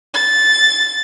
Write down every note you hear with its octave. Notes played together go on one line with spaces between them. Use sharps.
A6